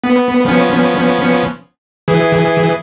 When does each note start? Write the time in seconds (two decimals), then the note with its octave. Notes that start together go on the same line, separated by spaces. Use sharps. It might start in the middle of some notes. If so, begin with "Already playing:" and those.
0.04 B3
0.45 F3 B3 C#4
2.08 E3 G#4